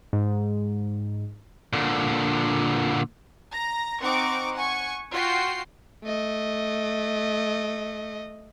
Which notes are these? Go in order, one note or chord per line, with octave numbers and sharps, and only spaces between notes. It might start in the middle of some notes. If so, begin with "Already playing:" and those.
G#2
A#2 D3
A#5 A#6
C4 D#4 F#5 C#6 D6
F#5 G#5 C#6
F4 F#4 G5 C7
A3 D#5